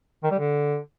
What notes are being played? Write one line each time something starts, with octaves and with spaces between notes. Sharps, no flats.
D#3
G3
D3